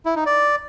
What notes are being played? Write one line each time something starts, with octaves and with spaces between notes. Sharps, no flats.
E4
D#4
D5